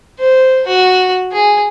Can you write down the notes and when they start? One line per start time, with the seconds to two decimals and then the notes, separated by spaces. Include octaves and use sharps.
0.19 C5
0.67 F#4
1.32 G#4